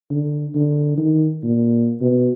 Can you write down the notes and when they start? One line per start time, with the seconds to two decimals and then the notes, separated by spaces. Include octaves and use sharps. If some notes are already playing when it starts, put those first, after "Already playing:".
0.10 D3
0.55 D3
0.97 D#3
1.44 A#2
2.01 B2